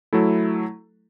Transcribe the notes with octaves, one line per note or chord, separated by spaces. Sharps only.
F#3 A3 E4 A4